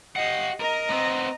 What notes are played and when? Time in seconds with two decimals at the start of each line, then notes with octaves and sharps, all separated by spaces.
0.16 G4 D#5 F#5 C7
0.60 A#4 D#5 A#5
0.90 B3 C4